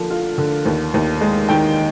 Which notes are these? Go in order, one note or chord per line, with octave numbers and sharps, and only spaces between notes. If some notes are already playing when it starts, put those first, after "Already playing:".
Already playing: D3 F3 A#3
F4
D3
D#2
D#2
G#3
D#3 G5